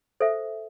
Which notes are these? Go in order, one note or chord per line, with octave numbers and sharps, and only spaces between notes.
A4 C5 E5